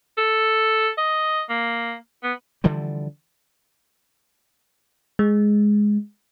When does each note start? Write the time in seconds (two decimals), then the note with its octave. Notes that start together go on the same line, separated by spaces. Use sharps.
0.18 A4
0.98 D#5
1.50 A#3
2.23 B3
2.64 D3 E3 F3 G3
5.19 G#3